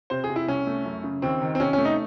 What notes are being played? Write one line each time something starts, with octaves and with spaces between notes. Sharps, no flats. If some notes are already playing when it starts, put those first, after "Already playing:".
C3 C5
G#4
C3
E4
C2 C#4
A3
F#2
C#3
D#2 C4
D#3
C4
C3 C#4
C#4
A3
D#4